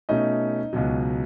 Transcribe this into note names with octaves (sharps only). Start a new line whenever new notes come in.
B2 A3 C#4 D#4 D#5
C#2 B2 F#3